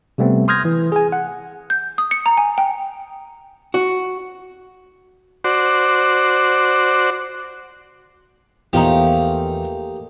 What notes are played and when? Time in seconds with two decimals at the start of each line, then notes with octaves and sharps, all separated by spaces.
0.18 C3 G3 A3 B3 C4
0.48 C6 D#6 F6 G6 G#6 A#6
0.65 E3
0.92 G#4 G#5
1.12 F#5
1.70 G6
1.98 D#6
2.11 C#7
2.26 A#5
2.37 G#5
2.58 G5
3.74 F#4
5.44 F#4 C5 D5
8.73 E2 F3 A3 A#3 D#4 G4